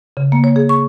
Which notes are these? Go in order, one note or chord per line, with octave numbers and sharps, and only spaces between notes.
C#3
A#3
C#5
G#4
C#6